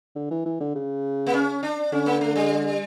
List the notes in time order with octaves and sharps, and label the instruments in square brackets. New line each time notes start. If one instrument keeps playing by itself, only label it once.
[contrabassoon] D3
E3
E3
D3
C#3
[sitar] A#3
C#4
D4
[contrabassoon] D3 [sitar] C#4
[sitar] A#3
A3
G3